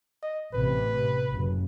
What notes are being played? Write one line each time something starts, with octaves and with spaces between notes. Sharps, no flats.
D#5
A1 C3 B4
F#1